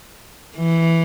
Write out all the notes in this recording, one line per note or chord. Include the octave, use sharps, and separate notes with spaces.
E3